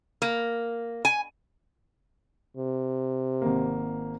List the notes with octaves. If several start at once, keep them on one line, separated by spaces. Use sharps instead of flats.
A#3
G#5
C3
G#1 A#3